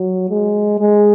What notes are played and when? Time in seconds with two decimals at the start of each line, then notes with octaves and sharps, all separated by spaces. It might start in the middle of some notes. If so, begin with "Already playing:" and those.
Already playing: F#3
0.30 G#3
0.80 G#3